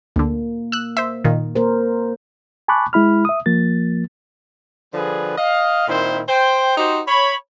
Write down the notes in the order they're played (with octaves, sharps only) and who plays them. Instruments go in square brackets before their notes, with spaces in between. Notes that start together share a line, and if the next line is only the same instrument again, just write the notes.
[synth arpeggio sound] D2 D3 [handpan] A#3
[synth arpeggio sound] E6 F#6
C5 E5
A#2 D#3
[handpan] A#3 A#4 C5
[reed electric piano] G#5 A5 B5 C#6 D6 F#6
G#3 E4 B5 F6
E5 D#6
F3 A#3 A6
[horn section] D3 F3 G3 G#4 B4
D#5 F5
A#2 D#3 C4 E4 C5
C5 G5
D#4 F#4 G4 C5
C#5 B5